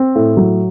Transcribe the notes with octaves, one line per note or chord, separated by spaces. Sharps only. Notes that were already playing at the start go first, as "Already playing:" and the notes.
Already playing: C4
A2
F#3